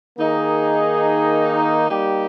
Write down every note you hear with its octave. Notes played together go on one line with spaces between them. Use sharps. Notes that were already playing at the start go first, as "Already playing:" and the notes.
D#3 A#3 D#4 G#4
G3 A#3 D#4 G4